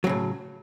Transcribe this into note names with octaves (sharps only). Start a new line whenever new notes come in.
A2 C#3 F#3